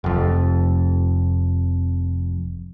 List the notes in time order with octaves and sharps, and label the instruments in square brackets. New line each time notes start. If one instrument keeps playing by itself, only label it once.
[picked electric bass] F1 F2